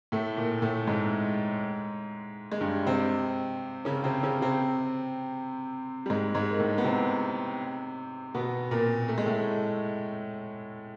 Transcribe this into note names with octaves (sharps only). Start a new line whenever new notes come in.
A2 A3
A#2 A#3
A2 A3
G#2 G#3
G#3
G2 G3
C3 C4
C#3 C#4
C3 C4
C#3 C#4
C3 C4
G3
G#2 G#3
G#2 G#3
A#3
A2 A3
B3
C3 C4
B2 B3
A#2 A#3
A3
G#3
A2 A3